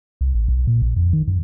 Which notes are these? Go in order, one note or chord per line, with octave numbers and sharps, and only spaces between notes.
C2
A1
B1
A#2
A#1
F2
D#3
F#2